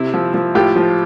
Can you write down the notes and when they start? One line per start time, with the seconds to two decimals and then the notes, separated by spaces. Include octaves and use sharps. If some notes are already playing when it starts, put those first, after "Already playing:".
Already playing: C3 E4
0.14 F3
0.34 F3
0.55 A2 F4 G4
0.76 F3